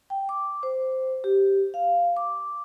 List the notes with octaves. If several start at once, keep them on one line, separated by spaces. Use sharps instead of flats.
G5
D6
C5
G4
F5
D6